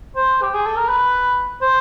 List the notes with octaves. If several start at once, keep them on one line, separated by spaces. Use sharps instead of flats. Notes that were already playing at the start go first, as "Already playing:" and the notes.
C5
G4
G#4
A4
A#4
B4
C5